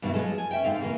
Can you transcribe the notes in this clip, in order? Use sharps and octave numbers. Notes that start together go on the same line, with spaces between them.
G2 B2 D#3 E3 F#3 E4
F3 F#3 G#3 A4
G#5
C#4 E5 G5
G#2 D3 C4 F5
C#3 E3 A#3